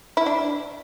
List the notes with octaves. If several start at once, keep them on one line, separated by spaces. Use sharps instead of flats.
E4
D4